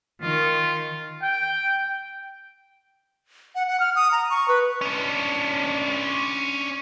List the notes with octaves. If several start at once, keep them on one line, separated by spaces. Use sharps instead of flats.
D#3 F4
G5
F#5
F#5
F6
D#6
A#5
C#6
B4
C#4 D4